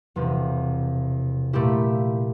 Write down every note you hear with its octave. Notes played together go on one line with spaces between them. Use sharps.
E1 E2 C3 F3
A#2 A3 E4 G4